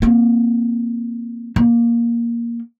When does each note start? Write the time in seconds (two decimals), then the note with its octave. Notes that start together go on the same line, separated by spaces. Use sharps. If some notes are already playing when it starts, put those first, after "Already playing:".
0.02 A#3 C4
1.56 A#3